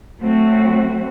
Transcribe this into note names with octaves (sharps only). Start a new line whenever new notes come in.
F#3 A3 C4 F#4